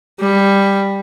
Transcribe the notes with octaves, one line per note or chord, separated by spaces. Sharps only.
G3